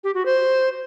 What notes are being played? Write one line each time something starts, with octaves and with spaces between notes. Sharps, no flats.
G4
F#4
C5